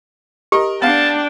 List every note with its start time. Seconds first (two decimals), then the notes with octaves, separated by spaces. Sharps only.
0.52 G4 A#4 D#5
0.82 B3 D4 F5 G5 A5